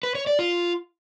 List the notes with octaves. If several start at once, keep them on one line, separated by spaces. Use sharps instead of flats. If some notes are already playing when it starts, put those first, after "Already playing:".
B4
C#5
D5
F4